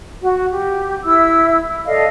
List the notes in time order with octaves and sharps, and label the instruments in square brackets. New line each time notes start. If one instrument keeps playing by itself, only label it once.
[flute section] F#4
G4
E4 E5 E6
A4 D5 D#5 F5